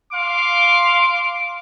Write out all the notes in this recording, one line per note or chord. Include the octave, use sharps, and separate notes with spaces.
F5 C6 D6